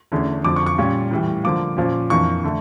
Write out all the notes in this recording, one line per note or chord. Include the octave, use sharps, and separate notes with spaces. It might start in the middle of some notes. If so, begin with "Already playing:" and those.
E2 D3 A3 C#4
F2 D3 F3 D6
C#6
C#6
A#2 G3 C#4
A2 E3 G3
D3 F3 A#3 D6
A#2 F3 C#4
F2 E3 A#3 D4 C#6
D3 A3